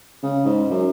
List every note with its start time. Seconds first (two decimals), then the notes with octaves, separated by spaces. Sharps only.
0.23 C#3
0.45 G#2
0.70 F#2